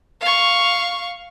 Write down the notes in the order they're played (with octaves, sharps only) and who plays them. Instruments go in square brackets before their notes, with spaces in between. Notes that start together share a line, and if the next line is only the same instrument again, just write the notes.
[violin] F5 C#6